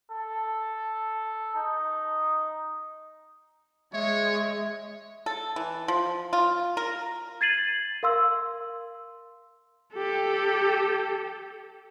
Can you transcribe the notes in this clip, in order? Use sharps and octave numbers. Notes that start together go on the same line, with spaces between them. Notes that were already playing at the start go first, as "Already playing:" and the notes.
A4
D#4
G#3 C#5 E5
A4
E3
F3
F4
A#4
G#6 A6 C7 D#7 F#7
A#4 F5 C6 E6
G4 A4